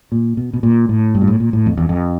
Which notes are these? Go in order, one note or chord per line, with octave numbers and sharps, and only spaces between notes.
A#2
B2
B2
A#2
A2
G2
A#2
A2
A#2
A2
F2
E2
F2